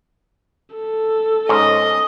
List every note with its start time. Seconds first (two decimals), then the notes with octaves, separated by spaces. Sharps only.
0.76 A4
1.49 G#2 C#4 D#5